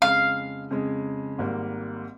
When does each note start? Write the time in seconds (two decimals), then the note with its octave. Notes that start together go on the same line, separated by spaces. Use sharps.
0.02 F2 C#3 G#3 F5
0.71 F2 C#3 G#3
1.38 G#1 G#2 G3 A#3